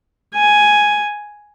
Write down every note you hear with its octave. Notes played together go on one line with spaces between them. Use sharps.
G#5